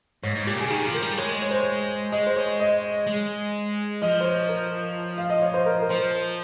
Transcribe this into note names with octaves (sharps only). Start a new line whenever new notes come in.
G#2 C#5
G#2
A#2 G4
C#3 G#4
D#3 G4
F3
A#4
G3
G#3 C#5
C#5
C5
C#5
G#3 D#5
C5
C#5
D#5
G#3
F3 D#5
C5
C#5
A#4
F5
D#5
C#5
C5
A#4
A#4
F3 C5